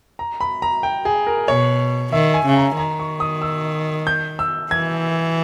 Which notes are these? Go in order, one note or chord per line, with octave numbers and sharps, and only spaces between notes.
A#5
B5
A#5
G5
G#4
A#4
B2 C#5
D#3 E5
G#5
C#3
A#5
D#3 A#5
C#6
D#6
E6
G6
E6
E3 G#6